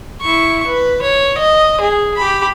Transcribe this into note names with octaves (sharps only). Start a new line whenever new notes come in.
E4 C#6
B4
C#5
D#5
G#4
G4 B5